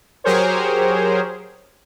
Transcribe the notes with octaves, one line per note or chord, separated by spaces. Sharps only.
F#3 G4 G#4 A#4 C5 C#5